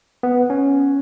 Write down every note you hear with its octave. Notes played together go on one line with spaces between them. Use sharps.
B3
C#4